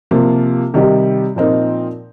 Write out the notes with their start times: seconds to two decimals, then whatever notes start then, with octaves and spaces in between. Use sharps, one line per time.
0.11 C3 F3 A#3 F4
0.74 C3 D#3 G3 D#4 G4
1.36 A#2 F3 C4 D#4 A#4